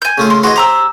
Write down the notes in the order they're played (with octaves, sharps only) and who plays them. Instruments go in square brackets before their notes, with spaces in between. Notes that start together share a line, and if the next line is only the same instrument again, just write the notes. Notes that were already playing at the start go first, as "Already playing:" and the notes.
[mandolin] G#5 G6
[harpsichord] C#3 A3 F4
[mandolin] C6
[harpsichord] E3 F#4 G#4 [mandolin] D#5 C6
[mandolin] G4 A#5 E6 [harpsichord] C5